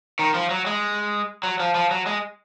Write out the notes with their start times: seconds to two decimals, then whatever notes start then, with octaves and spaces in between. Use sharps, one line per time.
0.19 D#3
0.34 F3
0.50 F#3
0.66 G#3
1.43 F#3
1.60 F3
1.75 F3
1.91 F#3
2.06 G#3